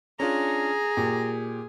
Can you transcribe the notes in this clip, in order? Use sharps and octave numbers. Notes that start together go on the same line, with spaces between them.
C#4 D4 F4 G#4 A#5
A#2 G4